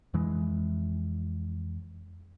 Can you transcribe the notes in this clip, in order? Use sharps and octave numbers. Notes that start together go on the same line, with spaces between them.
F2 E3 G#3